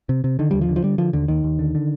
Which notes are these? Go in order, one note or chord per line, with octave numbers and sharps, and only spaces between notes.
C3
C3
D3 D#3
D#2 G3
F3
D3
F3
D3 G3
D3 F3
D#2 D3
D#2 D#3
D#2
D3
D3